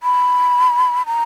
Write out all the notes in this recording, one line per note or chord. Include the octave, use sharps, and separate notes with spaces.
B5
A#5